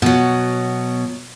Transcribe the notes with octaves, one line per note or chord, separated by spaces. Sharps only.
B2 F#3